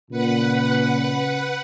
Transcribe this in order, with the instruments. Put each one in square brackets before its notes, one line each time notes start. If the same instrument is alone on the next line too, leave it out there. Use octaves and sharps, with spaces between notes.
[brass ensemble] A#2 [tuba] C#3 [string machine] B4 F#5